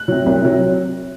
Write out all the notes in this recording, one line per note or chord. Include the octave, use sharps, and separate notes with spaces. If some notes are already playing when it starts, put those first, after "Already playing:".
Already playing: F#6
C3 F#3
C2
C3 F#3